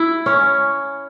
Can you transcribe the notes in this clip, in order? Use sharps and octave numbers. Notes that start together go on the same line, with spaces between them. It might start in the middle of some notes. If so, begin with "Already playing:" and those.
Already playing: E4
C#4